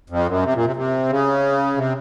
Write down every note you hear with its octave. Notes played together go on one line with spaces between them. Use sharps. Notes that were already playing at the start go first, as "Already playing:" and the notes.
F2
F#2
C3
A#2
C3
C3
C#3
C3